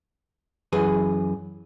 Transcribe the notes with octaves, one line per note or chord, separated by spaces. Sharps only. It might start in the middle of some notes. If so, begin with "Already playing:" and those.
F#2 E3 G#4 B4